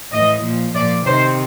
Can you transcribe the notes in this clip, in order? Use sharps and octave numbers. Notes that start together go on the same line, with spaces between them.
A2 E3 D#5
A#2 F3
A#2 F3 D5
C3 D#3 C5